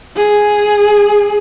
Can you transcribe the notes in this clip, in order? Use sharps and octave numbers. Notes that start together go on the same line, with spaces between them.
G#4